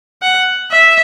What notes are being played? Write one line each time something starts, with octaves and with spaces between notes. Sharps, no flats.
F#5
E5